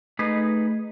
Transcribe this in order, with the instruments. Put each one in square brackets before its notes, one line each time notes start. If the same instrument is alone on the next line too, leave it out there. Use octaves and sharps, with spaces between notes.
[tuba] A3 [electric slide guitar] D#4 G#4 B4